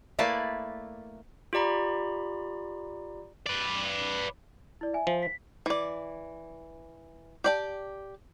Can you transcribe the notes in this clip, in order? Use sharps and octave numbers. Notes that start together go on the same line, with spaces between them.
A3 A#3 E4 B4 D5 A5
F4 G4 D5 A#5 B5
B4 D5
E4 D5
E5 G#5
F3
B6
E3 D5
G4 D5 A5